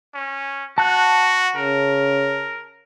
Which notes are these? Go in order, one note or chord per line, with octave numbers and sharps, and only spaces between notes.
C#4
F#4 A5 F#6
C#3 A#4